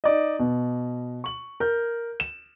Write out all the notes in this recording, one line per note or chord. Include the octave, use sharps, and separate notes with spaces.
D#4 D5 D#5
B2
C#6 F#7
A#4 G6
E7